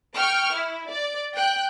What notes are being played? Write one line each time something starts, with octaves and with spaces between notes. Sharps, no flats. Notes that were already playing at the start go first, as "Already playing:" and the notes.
G5 C#6 F6
E4
D5
G5 F#6